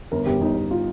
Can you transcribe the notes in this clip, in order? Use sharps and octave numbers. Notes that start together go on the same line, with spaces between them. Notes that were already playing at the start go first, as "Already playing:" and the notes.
G1 A#4
G1 G4
G1 D#4
G1
F4